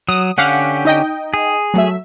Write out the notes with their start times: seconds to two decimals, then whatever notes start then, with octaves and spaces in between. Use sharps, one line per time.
0.09 F#3 D#6
0.38 D3 C#4 G4 F5 F#5
0.85 D#4 D#5 G5
1.34 G#4
1.74 F#3 A3 E5